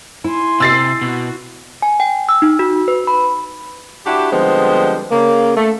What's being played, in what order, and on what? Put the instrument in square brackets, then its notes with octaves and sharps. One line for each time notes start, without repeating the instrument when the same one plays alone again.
[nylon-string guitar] E4 [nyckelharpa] G#5 C6
[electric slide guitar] C3 [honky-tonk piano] E6 A6 C7
[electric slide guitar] B2 [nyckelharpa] F#4
[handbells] G#5
G5
E6
D#4
F#4
B4
B5
[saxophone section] D4 E4 F#4 G4
D3 F3 G3 G#3 B3 C4
C#3 A#3
A3